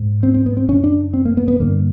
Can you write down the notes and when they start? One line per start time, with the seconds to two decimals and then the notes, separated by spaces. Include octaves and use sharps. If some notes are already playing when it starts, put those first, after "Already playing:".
Already playing: G#2
0.23 C4
0.34 C4
0.46 B3
0.57 C4
0.68 F#2 C#3 C#4
0.84 D4
1.14 C4
1.25 A#3
1.37 B3
1.48 B3
1.59 G2 D3 A#3